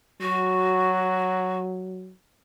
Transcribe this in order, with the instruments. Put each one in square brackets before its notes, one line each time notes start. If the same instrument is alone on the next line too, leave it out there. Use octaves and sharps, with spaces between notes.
[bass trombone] F#3 [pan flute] F#4